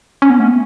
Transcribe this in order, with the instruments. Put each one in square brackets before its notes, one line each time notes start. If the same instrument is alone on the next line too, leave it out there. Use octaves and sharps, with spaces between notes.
[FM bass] C#4
B3
A3
B3